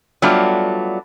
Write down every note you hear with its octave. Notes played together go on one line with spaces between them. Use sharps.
F#3 G3 A3 B3 D4 F4